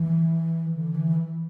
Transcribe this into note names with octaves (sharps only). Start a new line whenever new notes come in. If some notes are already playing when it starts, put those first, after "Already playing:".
Already playing: E3
D3
E3